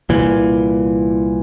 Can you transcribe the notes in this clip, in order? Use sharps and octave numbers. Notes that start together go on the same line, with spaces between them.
C2 A#2 E3